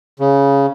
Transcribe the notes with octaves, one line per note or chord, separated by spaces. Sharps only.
C#3